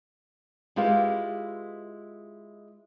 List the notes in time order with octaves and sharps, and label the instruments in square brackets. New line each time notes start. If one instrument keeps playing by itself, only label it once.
[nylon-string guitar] G#3 E4 F4 G4 B4 F5